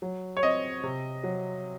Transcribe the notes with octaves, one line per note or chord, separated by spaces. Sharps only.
F#3
C#5
C4 D#5
C3
F#3